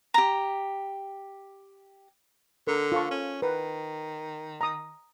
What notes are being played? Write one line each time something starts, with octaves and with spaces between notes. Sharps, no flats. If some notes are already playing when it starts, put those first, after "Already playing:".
G4 A#5
D3 A#4
F4 A4 C#6
C#4
D#3 B4
A#5 D#6